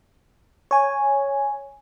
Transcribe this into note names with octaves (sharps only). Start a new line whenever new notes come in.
C#5 G#5